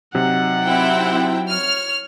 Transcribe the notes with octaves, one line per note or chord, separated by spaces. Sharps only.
C3 F#3 D#4 F#5
C4 E4 G5
C#5 F6